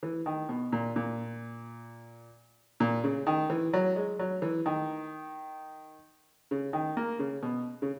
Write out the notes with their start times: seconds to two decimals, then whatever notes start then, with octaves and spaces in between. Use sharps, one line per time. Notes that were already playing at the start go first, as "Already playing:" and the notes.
0.03 E3
0.26 D#3
0.49 B2
0.72 A#2
0.96 A#2
2.80 A#2
3.04 C#3
3.27 D#3
3.50 E3
3.73 F#3
3.96 G#3
4.19 F#3
4.42 E3
4.66 D#3
6.51 C#3
6.73 D#3
6.97 A#3
7.19 C#3
7.43 B2
7.82 C#3